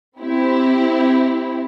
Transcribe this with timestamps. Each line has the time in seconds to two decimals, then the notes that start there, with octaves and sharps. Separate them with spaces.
0.20 C4 E4 G4